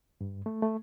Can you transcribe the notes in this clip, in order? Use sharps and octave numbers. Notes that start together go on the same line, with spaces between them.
G2
A3
A3